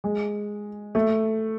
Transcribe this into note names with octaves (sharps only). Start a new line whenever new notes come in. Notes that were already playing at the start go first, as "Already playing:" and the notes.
G#3
A3